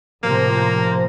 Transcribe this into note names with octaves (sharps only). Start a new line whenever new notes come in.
A2 C3 F3 A#3 C5 A#5